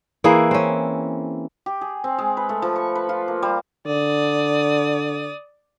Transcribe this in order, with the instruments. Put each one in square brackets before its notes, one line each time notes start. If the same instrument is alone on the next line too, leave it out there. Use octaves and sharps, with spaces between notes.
[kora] E3 A#3 E4 G#4
C4 C#4
[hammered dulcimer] G4
G#4
C4
G#3
B4
A3
F3
C#6
B4
F4
A#3
G3
[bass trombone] D3 [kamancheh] D5 D#6